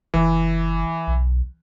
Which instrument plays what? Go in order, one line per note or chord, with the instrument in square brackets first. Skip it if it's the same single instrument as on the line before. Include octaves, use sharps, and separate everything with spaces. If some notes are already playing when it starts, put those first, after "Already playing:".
[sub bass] F#1 [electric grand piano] E3
[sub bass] B1